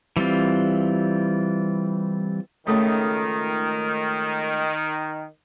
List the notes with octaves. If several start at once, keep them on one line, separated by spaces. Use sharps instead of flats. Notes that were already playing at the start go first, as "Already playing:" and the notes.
E3 G3 C4 F4
C#2 D#3 A3 D#4